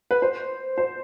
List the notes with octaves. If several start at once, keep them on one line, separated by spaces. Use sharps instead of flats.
B4
C5
C5